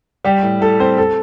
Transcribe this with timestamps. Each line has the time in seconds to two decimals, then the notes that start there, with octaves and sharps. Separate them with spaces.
0.24 G3 G4
0.43 A2
0.61 A2 A4
0.80 C4 C5
0.98 A4